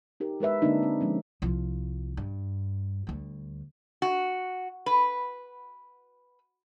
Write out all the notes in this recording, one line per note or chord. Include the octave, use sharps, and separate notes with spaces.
D#4 G4 A#4
G#3 A#4 B4 E5
D3 G#3 A#3 C4 D4 D#4
C4
F3 G#3 C#4
C2 F3
G2
D2 G3
F#4
B4